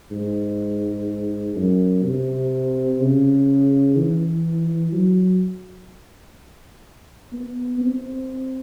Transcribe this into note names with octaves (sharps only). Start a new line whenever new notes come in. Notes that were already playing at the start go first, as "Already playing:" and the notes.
G#2
F#2
C3
C#3
E3
F#3
B3
C4